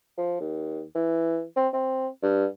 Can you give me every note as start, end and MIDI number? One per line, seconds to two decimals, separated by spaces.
0.18 0.37 53
0.40 0.82 39
0.95 1.43 52
1.56 1.68 60
1.73 2.08 60
2.23 2.46 43